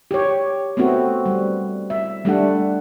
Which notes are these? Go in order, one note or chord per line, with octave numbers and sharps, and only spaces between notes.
G4 C#5
A3 B3 C4 F#4
G3
E5
G3 A3 D4 F#5